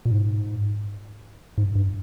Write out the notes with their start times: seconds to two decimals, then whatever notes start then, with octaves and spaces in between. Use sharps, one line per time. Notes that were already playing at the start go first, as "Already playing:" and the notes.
0.05 A#2
0.11 G#2
1.58 G#2
1.75 G2